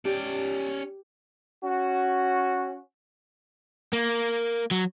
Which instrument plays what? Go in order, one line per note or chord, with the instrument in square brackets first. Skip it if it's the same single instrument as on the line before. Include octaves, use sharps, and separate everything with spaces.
[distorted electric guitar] C#4 D5 [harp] G4
[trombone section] C#4 F#4
[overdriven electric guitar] A#3
F#3